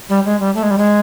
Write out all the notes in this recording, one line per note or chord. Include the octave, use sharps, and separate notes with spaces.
G3
G#3
G3
A3
G#3
G3
G#3